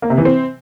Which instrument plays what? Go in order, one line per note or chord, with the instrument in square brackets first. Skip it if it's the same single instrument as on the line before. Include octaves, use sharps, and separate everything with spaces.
[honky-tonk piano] A#3
C3
E3
C4